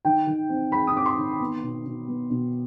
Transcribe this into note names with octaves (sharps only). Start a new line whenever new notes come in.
D#3 G5
D#3
C4
G#3 B5
D#6
C4 D6
C6
D#3
B3
B2
B2
B3
B2